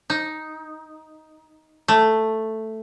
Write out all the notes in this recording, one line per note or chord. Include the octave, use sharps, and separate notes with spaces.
D#4
A3